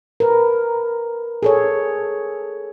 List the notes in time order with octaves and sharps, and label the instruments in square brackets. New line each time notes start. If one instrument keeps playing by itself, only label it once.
[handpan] A#4 B4
G#4 A4 C#5